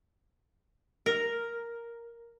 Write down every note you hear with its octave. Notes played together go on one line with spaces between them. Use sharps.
A#4